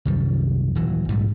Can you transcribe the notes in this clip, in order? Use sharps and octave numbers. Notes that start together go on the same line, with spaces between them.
C2 F#2 D#3 G3
D#1 E3 F#3
A#1 G#2 E3 G3